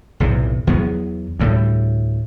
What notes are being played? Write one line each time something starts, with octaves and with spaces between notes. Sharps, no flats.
B1 E2 A2 C3
E2 F#3 B3
D2 A2 G3